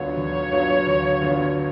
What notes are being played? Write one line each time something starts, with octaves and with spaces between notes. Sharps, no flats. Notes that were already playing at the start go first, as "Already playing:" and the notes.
Already playing: D2 D3 F#3 B3 F4 C#5
D2
D3 F#3 B3 F4
D2
D3 F#3 B3 F4